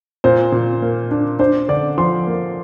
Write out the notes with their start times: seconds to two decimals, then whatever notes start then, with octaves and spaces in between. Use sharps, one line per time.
0.24 A#2 C5
0.52 A#2
0.82 A#3
1.11 D4
1.39 D4 C5
1.68 D3 D5
1.98 F3 C6
2.27 A#3